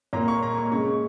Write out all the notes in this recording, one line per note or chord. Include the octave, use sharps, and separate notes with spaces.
A#2 A#3 A#5
C#6
A#5
C#6
C#3 G#3 C#6